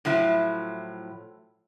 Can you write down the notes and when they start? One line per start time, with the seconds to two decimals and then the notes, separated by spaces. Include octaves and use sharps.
0.05 A2 F3 F#3 E4